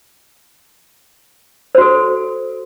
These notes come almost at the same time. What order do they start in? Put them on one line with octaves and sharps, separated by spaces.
C5 F#4 A4